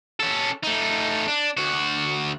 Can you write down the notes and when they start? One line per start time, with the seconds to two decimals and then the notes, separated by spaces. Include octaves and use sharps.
0.20 C#4 A4
0.63 A3 D#4
1.28 D4
1.57 D2 F#4